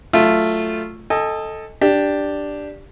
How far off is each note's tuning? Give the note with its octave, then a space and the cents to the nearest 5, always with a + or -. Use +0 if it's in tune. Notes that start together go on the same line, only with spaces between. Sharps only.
F#3 +0 A3 +0 F4 -10
A4 +5 D#5 +5 G#5 -35
D4 +0 G4 +0